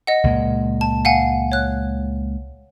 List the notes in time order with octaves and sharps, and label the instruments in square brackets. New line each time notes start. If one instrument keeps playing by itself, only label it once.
[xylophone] D#5 F#5
[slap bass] C#2 A#2 G#3
[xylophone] A5
F5 F#5 G#5
C#5 F#6